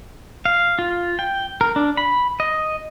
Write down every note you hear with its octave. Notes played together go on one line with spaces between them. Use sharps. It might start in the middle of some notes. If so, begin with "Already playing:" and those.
F5
F4
G5
A#4
D4
B5
D#5